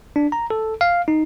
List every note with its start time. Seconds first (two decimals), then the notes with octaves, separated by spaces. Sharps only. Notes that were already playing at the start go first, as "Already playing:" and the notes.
0.16 D4
0.32 A#5
0.50 A4
0.81 F5
1.08 D#4